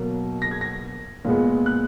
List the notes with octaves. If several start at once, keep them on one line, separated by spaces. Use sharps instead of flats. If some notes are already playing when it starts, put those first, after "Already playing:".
Already playing: B2 F#3 A#3
A#6
G#6
A#6
A#2 G#3 B3
F#6